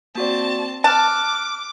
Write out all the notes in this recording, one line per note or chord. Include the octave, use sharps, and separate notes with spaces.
A#3 C4 F#4 D5 A5
A5 D6 F6 F#6